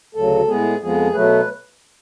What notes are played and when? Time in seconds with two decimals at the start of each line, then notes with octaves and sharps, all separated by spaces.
0.15 D2 C#3 F#3 A4
0.48 A2 G#3 B3 G#4
0.81 F2 F3 G#3 B3 G#4
1.14 B2 F#3 A3 B4